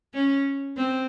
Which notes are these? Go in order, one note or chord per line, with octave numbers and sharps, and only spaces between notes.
C#4
C4